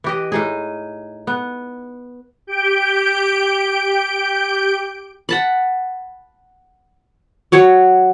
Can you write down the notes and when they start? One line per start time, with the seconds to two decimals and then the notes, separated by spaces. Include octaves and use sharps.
0.04 E3 G4 D#5
0.32 A2 D#4 G#4
1.27 B3
2.47 G4 G6 D7
5.29 F#5 A5 B5
7.52 F#3 F#4 C#5